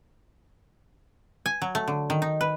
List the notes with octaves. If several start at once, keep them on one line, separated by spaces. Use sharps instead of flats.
G#5
F#3
A3
D3
D#3
D#4
B4